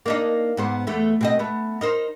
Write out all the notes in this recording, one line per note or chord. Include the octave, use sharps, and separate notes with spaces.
A#3 D4 D#4
G#2 B3 C5
E2 A3 B3
B2 C4 D#5
A3 B3
D#4 A#4 C5